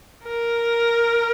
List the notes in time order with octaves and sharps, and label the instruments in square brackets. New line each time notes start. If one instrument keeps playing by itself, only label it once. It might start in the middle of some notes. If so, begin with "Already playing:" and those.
[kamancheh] A#4